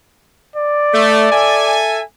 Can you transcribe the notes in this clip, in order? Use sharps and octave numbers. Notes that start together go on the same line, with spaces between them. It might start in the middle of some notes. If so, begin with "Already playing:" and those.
D5
A3
A4 E5 G#5